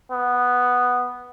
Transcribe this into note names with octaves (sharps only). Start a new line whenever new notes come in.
B3